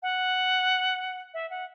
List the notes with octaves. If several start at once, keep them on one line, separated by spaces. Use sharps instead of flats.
F#5
E5
F#5